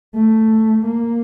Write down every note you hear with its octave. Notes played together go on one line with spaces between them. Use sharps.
A3
A#3